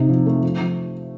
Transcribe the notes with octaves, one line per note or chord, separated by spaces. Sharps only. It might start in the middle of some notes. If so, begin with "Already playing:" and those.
Already playing: C3 D#4
F3
A3
F3
F3